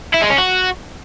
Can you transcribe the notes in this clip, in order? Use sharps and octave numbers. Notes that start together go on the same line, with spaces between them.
E4
G#3
C#4
F#4